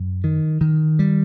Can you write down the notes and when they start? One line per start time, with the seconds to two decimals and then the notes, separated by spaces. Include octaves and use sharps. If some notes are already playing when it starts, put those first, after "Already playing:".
Already playing: F#2
0.24 D#3
0.61 D#3
0.99 G3